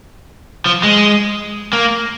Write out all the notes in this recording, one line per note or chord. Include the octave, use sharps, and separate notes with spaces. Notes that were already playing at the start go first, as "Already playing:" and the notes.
F3
G#3
A#3